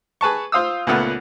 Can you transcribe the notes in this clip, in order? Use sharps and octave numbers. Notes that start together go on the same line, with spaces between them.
G#4 B4 A5 C#6
F4 C5 F5 D#6 E6
C#2 A#2 A3 B3 F#5